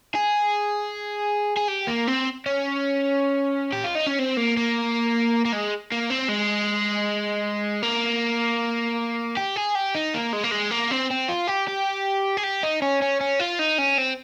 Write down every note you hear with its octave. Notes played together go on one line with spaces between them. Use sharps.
G#4
G#4
G4
A#3
C4
C#4
G4
F4
D#4
C#4
C4
A#3
A#3
A#3
G#3
A#3
C4
G#3
A#3
G4
G#4
G4
D#4
A#3
G#3
A#3
G#3
A#3
C4
C4
F4
G4
G4
G#4
G4
D#4
C#4
C#4
C#4
F4
D#4
C#4
C4